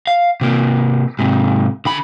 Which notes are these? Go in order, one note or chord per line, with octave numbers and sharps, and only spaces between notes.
F5
C3 A#3
G#2 C3
D3 B5